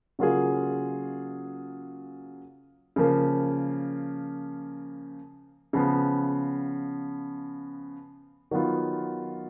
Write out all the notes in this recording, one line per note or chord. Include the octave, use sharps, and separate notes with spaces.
C#3 F#3 A#3 F4 G#4
C#3 F3 A#3
C#3 F3 B3
D#3 F#3 B3 F4